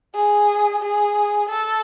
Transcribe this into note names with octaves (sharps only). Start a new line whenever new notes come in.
G#4
G#4
A4